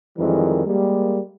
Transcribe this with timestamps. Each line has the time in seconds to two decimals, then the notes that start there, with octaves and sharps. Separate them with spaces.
0.18 F2 D#3 E3 G3 G#3 A#4
0.66 G3 G#3 A#3